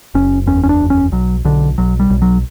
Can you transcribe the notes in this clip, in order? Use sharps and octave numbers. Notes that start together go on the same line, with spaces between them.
F#1 C#4
E2 C#4
C#4
D4
F#1
C#4
B1 F#3
B1 D3
B1 F#3
G3
B1
F#3